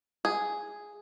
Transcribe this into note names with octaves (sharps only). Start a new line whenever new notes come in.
G#4